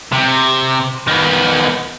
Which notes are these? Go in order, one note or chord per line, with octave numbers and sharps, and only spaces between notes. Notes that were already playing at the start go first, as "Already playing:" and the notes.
C3
D#3 B3